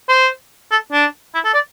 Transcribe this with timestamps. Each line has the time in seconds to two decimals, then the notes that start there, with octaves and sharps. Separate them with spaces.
0.09 C5
0.71 A4
0.93 D4
1.34 E4
1.45 A4
1.54 D5